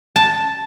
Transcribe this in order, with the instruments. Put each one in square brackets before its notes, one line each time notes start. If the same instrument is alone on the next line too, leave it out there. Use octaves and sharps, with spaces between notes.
[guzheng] A5